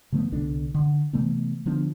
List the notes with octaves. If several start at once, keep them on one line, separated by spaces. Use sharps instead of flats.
C#3 F3 A3 B3
C2 B2 D3 D4
D3
C3 E3 A3 B3
D3 F3 B3 D4